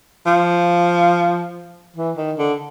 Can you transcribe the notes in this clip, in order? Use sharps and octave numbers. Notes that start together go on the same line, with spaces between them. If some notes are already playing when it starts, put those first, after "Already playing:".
F3
E3
D#3
D3